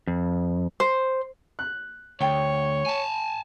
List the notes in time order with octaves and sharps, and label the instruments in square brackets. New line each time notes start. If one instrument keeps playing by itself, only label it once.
[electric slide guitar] F2
[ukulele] C5
[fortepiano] F#6
[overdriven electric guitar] D2 [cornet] C#5 [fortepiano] G5
[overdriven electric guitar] G#5 A5